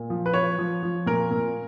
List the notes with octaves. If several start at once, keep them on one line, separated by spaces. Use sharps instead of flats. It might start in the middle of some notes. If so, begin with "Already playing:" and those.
Already playing: A#2
F3
B4
F3 C#5
F3
F3
A#2 A#4
A#2